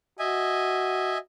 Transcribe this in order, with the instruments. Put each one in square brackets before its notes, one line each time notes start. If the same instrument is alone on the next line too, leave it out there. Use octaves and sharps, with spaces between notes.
[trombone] F#4 [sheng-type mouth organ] D#5 E5 G#5